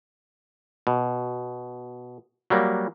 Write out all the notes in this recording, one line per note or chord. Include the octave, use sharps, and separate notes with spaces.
B2
F#3 G3 A#3